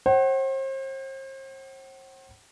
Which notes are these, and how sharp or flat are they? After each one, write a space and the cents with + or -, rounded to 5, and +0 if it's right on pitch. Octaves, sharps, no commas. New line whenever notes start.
C5 +40 F#5 +40